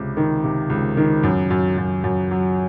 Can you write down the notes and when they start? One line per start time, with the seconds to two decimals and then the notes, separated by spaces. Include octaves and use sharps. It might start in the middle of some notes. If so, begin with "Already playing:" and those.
Already playing: C#2 C3
0.17 D#3
0.44 C3
0.70 C#2
0.97 D#3
1.23 F#2
1.50 F#2
1.78 F#2
2.04 F#2
2.31 F#3